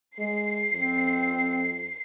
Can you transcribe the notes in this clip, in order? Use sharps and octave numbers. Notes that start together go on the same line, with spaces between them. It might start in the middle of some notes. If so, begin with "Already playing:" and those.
G#3 C7
F2 C4